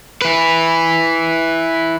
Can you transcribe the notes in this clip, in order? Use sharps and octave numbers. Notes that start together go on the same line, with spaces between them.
E4 B4